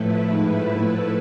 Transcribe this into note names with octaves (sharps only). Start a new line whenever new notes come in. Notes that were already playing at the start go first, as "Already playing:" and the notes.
Already playing: A2 F3 A3 E4 B4
G#2
A2